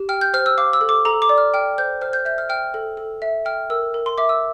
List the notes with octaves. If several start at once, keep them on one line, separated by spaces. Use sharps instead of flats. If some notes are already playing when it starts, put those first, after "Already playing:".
Already playing: G4
G5 F6
G6
C5 F6
E6
F5 D6
E6
A4
D6
A4 A#5
D6
D5
F6
G5 F6
C5 G6
C5 F6
G6
E5 G6
F6
G5 F6
A4
A4
E5
G5 F6
A#4 E6
A#4
C6
E5 D6
E6